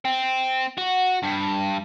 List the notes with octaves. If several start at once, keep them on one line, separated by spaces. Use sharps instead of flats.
C4
F#4
G2